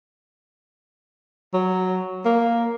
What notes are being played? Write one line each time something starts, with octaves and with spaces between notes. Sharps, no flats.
F#3
A#3